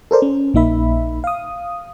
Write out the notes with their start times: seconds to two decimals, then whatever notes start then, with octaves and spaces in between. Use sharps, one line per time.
0.11 A4 A#4 C5 D5
0.22 C#4
0.54 A#1 A#3 D#4 E5 B5
1.24 F5 D#6